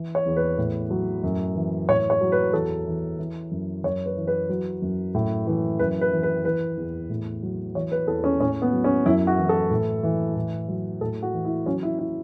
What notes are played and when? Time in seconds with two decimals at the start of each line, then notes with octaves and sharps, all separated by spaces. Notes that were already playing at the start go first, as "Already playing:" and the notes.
Already playing: E3
0.15 C#5
0.26 E2
0.37 B4
0.58 A2
0.90 F#3
1.23 F#2
1.55 E3
1.89 A2 C#5
2.10 C#5
2.21 F#3
2.32 B4
2.53 E2 A4
2.86 E3
3.19 E3
3.51 F#2
3.84 F#2 C#5
4.06 B4
4.17 E3
4.27 B4
4.49 F#3
4.82 F#2
5.15 A2
5.47 E3
5.79 F#2 B4
6.01 B4
6.12 E3
6.23 B4
6.45 E3 B4
6.77 E2
7.10 A2
7.43 F#3
7.75 E3 C#5
7.92 B4
8.07 E2 A4
8.24 C#4
8.40 A2 C#4
8.62 B3
8.73 F#3
8.84 C#4
9.06 F#2 E4
9.27 F#4
9.38 E3
9.49 A4
9.71 A2
10.03 E3
10.36 A2
10.68 F#3
11.01 A2 A4
11.23 F#4
11.34 E3
11.45 E4
11.66 F#3 C#4
11.83 E4
11.99 E4